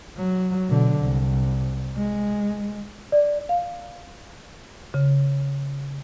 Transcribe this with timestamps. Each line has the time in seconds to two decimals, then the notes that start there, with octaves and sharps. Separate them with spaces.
0.17 F#3
0.68 B2 D3
1.00 C2
1.97 G#3
3.12 D5
3.49 F5
4.94 C#3